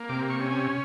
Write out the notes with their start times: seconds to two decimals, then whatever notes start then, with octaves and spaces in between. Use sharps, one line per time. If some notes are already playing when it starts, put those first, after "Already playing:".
Already playing: A#3
0.09 C3 D6
0.30 C#6
0.41 C#4
0.51 G#5